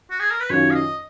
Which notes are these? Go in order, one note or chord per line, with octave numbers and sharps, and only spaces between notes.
F#4
G#4
A#4
B4
F#2 D#3 F#3 C#4 F4 C#5
F5
D#5